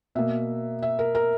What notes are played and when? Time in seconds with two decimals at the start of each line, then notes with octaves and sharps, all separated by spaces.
0.15 B2 A#3 E5
0.82 E5
0.99 A#4
1.15 A#4